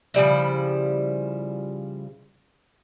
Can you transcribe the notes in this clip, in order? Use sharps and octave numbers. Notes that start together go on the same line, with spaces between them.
C#3 F3 G3 E4